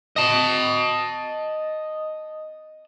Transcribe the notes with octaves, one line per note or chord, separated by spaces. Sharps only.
D#5 A5